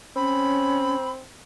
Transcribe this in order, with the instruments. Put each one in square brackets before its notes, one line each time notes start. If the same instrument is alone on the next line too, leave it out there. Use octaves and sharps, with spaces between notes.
[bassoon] C4 [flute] C#4 [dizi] B5